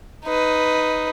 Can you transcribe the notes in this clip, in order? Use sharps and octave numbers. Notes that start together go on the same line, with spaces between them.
D#4 B4